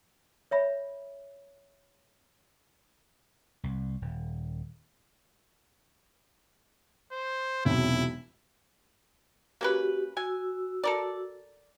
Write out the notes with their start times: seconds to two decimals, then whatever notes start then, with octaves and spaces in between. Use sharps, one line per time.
0.51 C#5 E5 B5
3.64 C2
4.02 D#1
7.12 C5
7.65 E1 B1 C3 E4
9.61 A#3 C#4 F#4 G4 B4
10.17 F#4 G#5 E6
10.84 A4 A#4 D5